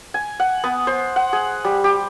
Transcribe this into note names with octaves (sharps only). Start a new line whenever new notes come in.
G#5
F#5
B3
C5
F#5
G#4
G3
G4